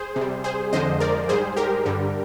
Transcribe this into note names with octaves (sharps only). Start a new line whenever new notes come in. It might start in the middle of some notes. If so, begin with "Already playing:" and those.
Already playing: G#4 C5
C3
G3
G#4 C5
F2 D3 F3 G#3 C5 D#5
A#4 D5
G#2 G3 G#4 C5
G4 A#4
G2 D3 G3